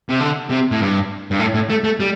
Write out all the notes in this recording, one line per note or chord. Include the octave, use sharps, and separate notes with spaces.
C3
D3
C3
A2
G2
G2
A2
A2
A3
A3
G3